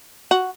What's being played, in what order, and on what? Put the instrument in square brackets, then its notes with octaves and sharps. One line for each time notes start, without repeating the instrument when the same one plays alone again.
[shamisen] F#4